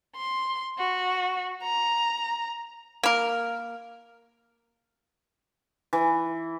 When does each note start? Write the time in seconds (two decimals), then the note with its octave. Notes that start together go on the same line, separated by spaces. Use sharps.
0.16 C6
0.79 F#4
1.63 A#5
3.03 A#3 A#4
5.93 E3